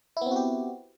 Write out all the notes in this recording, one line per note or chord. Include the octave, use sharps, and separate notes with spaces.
B3 C4 E4 F#4 G4